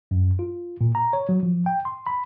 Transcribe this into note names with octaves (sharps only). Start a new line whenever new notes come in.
F#2
F4
A#2
A#5
C#5
F#3
F3
G5
C6
B5